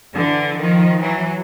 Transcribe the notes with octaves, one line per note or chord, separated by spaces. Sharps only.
D3 E3
D#3 F3
E3 F#3